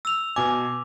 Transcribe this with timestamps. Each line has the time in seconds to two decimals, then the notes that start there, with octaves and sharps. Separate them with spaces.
0.05 E6 F7
0.36 B2 G#5 D6